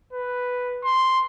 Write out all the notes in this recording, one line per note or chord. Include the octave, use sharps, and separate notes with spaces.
B4
C6